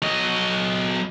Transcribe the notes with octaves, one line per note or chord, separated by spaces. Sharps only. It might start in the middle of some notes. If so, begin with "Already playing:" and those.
F#3 D#5